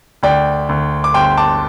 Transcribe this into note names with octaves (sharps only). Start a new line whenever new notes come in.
D2 D5 G5
D2
D6
G1 G5 C6
A5 D6